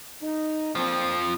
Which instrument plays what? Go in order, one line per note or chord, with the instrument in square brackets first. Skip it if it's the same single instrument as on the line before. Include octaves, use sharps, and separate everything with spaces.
[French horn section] D#4
[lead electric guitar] F2 F3 [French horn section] A#2 D3 C4